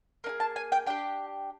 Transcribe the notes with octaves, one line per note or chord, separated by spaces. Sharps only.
A#3 D#4
G#4
A5
G#5
G5
D4 G4 G5